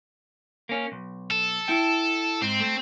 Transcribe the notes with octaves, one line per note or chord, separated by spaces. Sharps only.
A#3 C#4
B1
A4
E4 G5
G#2 C4
A3